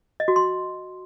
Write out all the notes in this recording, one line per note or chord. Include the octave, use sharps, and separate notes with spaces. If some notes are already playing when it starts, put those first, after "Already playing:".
D#5
F#4
C6